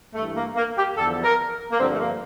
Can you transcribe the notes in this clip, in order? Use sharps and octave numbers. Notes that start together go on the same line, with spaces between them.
G2 E3 A3
A#3
A#3
G4
E2 D3 F3 A4
A#4
A#3
G2 D3 F3 C4
A3
A#3